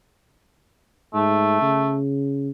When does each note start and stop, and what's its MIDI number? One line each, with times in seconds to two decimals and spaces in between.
1.14 1.59 44
1.14 1.97 57
1.61 2.50 49